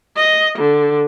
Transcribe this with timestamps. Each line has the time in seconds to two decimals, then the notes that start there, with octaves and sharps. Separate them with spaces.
0.17 D#5
0.59 D3